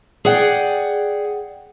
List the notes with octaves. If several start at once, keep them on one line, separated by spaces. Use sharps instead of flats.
G#4 D5 F#5 G5